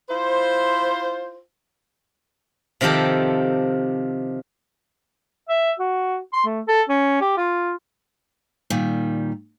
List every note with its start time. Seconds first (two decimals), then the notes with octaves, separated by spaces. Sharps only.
0.09 E4 F4 C5
2.81 C3 D#3 F3 G4 A4
5.49 E5
5.80 F#4
6.33 C6
6.45 A3
6.68 A4
6.89 C#4
7.21 G4
7.37 F4
8.70 A#2 D#3 G3